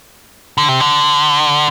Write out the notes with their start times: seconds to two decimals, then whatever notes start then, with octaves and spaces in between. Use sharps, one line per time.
0.58 D3
0.68 C3
0.80 D3